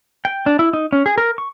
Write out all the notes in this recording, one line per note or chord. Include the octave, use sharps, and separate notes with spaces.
G5
D4
E4
D#4
C#4
G#4
A#4
C#6